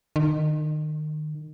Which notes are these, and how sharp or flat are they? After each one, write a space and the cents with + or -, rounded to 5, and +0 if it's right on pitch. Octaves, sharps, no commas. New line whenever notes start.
D#3 -30